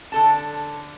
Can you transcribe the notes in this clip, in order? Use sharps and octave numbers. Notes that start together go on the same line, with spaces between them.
D3 A4 A5